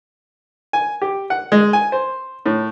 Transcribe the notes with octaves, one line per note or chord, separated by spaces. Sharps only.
G#5
G4
F#5
G#3
G#5
C5
A2